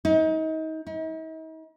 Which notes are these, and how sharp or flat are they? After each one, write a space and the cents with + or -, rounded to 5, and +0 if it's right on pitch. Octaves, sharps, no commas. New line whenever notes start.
D#4 +30
D#4 +45